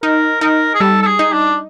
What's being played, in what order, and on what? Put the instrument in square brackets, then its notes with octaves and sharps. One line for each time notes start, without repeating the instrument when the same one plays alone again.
[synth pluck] D#4 [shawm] A#4
[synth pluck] D#4 [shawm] A#4
[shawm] G#4
[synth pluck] G3 [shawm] A4
[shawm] A4
G#4
[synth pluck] D#4
[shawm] D4